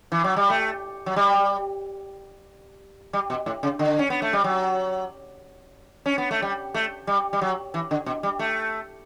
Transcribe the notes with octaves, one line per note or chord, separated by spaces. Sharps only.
E3
F#3
G3
A3
F#3
G3
G3
B2
A2
C#3
D3
C#4
B3
A3
G3
F#3
C#4
B3
A3
G3
A3
G3
G3
F#3
E3
D3
B2
G3
A3